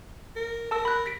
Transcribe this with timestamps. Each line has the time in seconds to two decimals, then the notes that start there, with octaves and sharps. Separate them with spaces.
0.36 A#4
0.71 A#4 A5 E6
0.85 B5 F#6
1.06 A#6 B6 D7